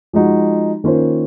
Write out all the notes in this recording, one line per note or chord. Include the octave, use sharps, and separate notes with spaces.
F3 G#3 D#4 F#4
D#3 A#3 C#4 F4 C5